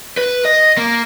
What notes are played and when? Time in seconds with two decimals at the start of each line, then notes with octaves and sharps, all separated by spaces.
0.17 B4
0.45 D#5
0.78 A#3